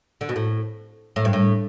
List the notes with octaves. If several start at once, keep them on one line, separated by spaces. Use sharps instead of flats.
D3
B2
A2
A2
G2
A2